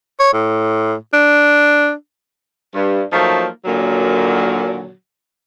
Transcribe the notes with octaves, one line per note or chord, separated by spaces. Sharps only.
C#5
A2
D4
G2
F3 F#3 A3 A#3 D#4
A#2 D3 D#3 F#3